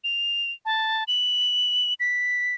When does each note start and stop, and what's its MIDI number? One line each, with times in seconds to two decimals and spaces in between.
0.04 0.52 101
0.65 1.04 81
1.08 1.94 102
2.00 2.55 95